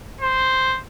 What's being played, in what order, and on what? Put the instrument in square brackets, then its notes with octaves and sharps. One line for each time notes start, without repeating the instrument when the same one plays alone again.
[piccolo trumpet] C5